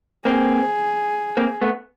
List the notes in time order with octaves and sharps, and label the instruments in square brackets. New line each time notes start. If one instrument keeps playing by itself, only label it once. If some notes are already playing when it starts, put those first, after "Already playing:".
[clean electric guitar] A#3 C4 [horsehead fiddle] G#4
[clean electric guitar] A#3 C4
A3 B3